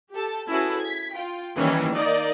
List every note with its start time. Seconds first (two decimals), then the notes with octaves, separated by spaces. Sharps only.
0.14 G4 A4 A5
0.50 C#4 E4 F#4 G#4 A4 B4
0.82 G#6 B6
1.15 F4 G5
1.58 D#3 E3 G3 A#3 C#4
1.95 A#3 D#4 D5 D#5